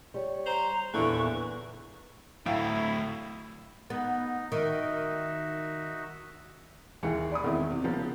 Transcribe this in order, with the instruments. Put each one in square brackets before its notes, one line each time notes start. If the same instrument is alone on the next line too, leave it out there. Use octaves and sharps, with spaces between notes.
[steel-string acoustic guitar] G3 C#5
[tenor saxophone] C5 [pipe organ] A#5
[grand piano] E2 A#2 [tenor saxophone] D3 [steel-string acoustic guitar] E4 A4 [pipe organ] B4 C#6
[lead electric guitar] D2 F#3 [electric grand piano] A2 E5 [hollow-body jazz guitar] A3 F5 G5 [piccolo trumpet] E4
[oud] B3 [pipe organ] D#4
[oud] D#3 [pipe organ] D#4 F#4 E5
[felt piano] D#2 E3 G#4 C#7
D5 B5 D#6
E2 D#3 G#3 C4 E4
C3
C#3 F3 A#3 B3